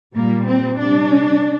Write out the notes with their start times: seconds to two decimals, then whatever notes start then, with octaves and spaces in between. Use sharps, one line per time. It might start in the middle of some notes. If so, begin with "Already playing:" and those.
0.14 A#2 G3 A#3
0.46 C4
0.77 C3 G3 D4